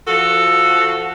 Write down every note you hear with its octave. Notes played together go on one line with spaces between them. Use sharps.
F3 F#4 A4